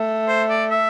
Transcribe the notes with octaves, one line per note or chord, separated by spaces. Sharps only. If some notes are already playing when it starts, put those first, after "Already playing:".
Already playing: A3
C5
D5
E5